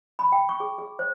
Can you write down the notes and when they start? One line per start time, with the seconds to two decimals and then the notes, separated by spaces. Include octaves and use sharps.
0.19 B5
0.32 G5
0.49 C#6
0.60 G#4
0.78 G#4
0.99 C5